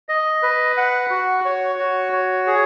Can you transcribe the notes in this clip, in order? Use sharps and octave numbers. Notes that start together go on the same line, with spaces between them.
D#5
B4
F#5
F#4
C#5
F#4
C#5
G#4